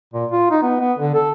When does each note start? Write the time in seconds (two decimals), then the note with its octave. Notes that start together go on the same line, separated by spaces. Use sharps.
0.14 A#2
0.32 F4
0.51 D#4
0.63 B3
0.80 B3
0.99 D3
1.15 A4